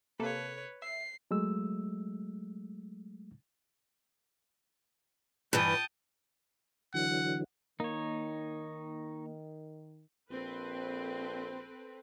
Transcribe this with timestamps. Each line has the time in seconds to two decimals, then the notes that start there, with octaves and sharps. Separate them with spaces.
0.20 C3 A#3 A4 B4 C#5
0.82 E5 C7
1.31 F#3 G#3 A3 E6
5.53 G2 E3 G5 A5 D#6
6.94 D3 E3 F#3 F#5
7.80 D#3 A#3 D#4 C#5
10.31 A#1 C4 A4 B4